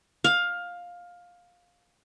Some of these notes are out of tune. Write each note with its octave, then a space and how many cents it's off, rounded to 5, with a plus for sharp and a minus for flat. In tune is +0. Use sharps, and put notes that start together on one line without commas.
F5 +15